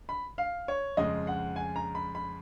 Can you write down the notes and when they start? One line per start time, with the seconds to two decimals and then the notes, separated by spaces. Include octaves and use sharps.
0.09 B5
0.38 F5
0.68 C#5
0.97 F2 C#3 G#3 D#5
1.27 F#5
1.56 G#5
1.76 A#5
1.95 B5
2.15 B5